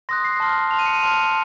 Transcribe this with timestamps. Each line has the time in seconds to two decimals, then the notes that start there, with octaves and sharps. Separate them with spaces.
0.09 C6 D#6 F#6 A#6
0.24 C7
0.40 A5 C6 F6
0.71 A5 C6 F6 F7
0.79 D#7
0.86 C#7
0.93 D#7
1.02 A5 C6 F6 F7